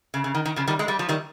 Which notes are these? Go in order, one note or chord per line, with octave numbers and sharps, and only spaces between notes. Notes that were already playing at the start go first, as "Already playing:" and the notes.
C#3
C#3
D#3
D#3
C#3 F3
D#3 G3
G#3
G3
F3
D#3 G3